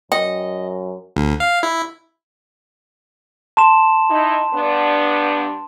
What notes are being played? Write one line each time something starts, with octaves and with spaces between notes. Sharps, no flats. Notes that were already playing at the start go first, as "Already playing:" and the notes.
F#2 D#5 G5
D2
F5
E4
A5 C6 E7
D#4 E4
G2 B3 D4